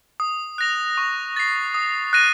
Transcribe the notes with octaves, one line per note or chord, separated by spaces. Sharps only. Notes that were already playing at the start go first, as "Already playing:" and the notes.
D#6
F#6 A#6 F7
C#6
A6 C7
D#6
F#6 A#6 D#7